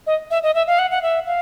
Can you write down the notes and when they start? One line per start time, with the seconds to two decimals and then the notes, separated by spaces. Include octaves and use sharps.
0.07 D#5
0.31 E5
0.43 D#5
0.55 E5
0.67 F5
0.79 F#5
0.91 F#5
1.03 E5
1.26 F5